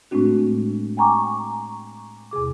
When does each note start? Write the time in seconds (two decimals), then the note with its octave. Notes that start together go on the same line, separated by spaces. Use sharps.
0.11 A2 G#3 A3 C4 D4 F#4
0.97 G5 G#5 A#5 C#6 D6
2.31 E2 C3 G#4 D6